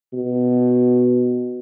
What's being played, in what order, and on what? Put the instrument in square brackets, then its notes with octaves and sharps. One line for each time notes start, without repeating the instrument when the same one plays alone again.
[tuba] B2